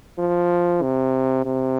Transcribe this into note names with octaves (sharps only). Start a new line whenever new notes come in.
F3
C3
C3